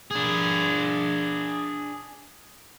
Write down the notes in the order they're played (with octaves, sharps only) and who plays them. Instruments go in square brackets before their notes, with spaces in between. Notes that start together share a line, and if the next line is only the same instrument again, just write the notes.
[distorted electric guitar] D4 G#4